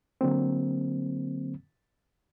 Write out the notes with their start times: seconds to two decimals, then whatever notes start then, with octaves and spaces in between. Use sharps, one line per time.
0.21 D3 F#3 A#3 C4